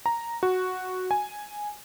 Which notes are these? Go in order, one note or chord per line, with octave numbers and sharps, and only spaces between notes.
A#5
F#4
G#5